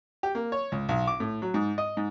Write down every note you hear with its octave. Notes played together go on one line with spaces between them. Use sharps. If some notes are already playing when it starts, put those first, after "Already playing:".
G4
A#3
C#5
C#2
B1
D6
A2
F#3
G#2
D#5
G#2